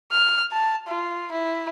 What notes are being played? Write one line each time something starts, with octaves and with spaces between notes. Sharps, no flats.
F6
A5
F4
E4